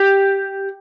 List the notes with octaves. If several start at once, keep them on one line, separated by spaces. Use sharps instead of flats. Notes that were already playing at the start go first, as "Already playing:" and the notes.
Already playing: G4